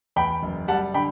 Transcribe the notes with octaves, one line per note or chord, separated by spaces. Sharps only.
E2 G5 B5
F#1
G3 F#5 A5
D3 G5 B5